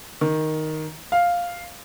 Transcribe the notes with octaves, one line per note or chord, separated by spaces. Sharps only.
D#3
F5